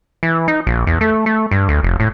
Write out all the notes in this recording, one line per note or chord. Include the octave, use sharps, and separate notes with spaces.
E3
D#4
A#1
E2
A3
A3
G2
D2
F1
A2